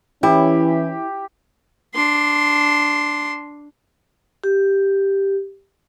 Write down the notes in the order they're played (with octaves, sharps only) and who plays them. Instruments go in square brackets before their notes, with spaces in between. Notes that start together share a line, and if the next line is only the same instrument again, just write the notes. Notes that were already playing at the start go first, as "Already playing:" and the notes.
[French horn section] E3 C#4 [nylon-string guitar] E4 [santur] G4
[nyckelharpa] D4 C6
[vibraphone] G4